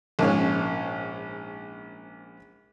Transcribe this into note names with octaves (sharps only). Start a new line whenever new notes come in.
A#1 G#2 C#4